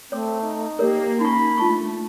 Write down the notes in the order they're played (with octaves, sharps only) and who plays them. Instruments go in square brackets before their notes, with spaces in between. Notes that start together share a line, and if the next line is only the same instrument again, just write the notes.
[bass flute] A3 [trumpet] C4 [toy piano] C#5 D6
[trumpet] D#4
[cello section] A#3 [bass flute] G4 [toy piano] A#4 C#5
[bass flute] C#4 [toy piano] D#4 C#6 [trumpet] B5
[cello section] A3 [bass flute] D4 [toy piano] F4 A5 C#6